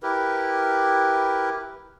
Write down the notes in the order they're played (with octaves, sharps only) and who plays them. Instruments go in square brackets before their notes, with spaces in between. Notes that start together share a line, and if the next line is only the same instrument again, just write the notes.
[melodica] E4 G4 A#4 B4